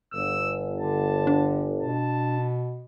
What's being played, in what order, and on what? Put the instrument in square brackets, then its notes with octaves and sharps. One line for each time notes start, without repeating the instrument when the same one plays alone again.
[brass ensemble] G1 [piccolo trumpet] E6
[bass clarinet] D3 [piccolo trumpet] A5
[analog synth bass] D4
[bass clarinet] B2 [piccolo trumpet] A5